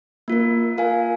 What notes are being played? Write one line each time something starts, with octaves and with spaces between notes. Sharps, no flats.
A#3 F4 A#4
F4 A#4 F5 G#5